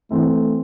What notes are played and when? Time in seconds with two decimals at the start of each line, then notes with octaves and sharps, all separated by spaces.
0.11 E3 A3 C4 E4